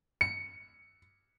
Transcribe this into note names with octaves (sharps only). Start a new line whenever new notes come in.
C#7